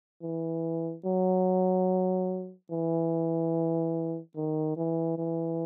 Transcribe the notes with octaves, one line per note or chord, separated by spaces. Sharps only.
E3
F#3
E3
D#3
E3
E3